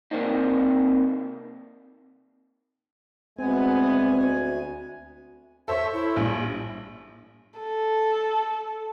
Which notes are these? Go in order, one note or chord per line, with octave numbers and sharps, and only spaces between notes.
C3 A#3 C4 D4 D#4
D2 G#3 B3 C4 G#5
A4 C5 C#5 E5
E4
A#1 G3
A4